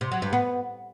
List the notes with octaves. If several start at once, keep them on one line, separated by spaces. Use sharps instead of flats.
C3
F#3
G2
B3